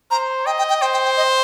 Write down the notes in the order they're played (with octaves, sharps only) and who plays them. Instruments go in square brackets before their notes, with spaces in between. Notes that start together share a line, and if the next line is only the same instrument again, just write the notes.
[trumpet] C5 [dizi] A#5
[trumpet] D#5 [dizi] G5
[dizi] G5
G5
[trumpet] C5 [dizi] G5
[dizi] G5
G5
D#5